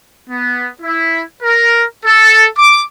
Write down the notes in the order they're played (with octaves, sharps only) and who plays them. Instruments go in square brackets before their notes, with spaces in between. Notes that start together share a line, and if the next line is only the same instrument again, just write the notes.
[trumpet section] B3
E4
A#4
A4
D6